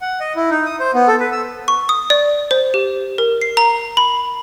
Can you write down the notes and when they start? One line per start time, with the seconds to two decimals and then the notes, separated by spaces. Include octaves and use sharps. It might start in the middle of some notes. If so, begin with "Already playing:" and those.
0.01 F#5
0.20 D#5
0.36 E4
0.50 D#4
0.66 D#6
0.80 C5
0.94 B3
1.08 A4
1.20 B4
1.32 E6
1.68 C#6
1.89 D#6
2.10 D5
2.51 C5
2.74 G4
3.18 A#4
3.41 C7
3.57 A#5
3.97 B5